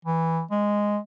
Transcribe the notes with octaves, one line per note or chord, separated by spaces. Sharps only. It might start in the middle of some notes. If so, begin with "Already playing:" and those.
E3
G#3